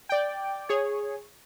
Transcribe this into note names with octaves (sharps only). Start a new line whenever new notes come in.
D5 G5
G#4 C#5